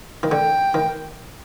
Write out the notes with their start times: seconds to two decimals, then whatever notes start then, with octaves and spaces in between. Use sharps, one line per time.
0.23 D#3
0.31 D3 G5
0.74 D#3